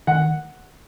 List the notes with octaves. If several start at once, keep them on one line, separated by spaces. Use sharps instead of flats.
D#3 F#5